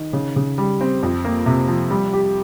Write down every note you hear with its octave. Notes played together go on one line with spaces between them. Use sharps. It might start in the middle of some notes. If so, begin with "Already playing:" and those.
Already playing: D#3
C#3
C#3
G3
C4
F2
A#3
C3
F3
G3
G4